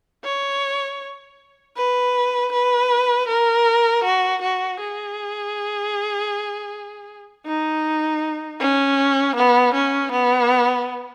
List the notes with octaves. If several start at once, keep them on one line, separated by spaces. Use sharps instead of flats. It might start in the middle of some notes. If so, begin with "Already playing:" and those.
C#5
B4
B4
A#4
F#4
F#4
G#4
D#4
C#4
B3
C#4
B3